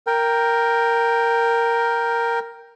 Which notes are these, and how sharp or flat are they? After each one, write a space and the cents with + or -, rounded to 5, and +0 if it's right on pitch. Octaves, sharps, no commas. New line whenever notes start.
A#4 +0 G5 +0